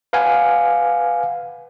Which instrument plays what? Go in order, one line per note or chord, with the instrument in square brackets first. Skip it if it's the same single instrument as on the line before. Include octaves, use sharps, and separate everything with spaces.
[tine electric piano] B4 F5 F#5 G#5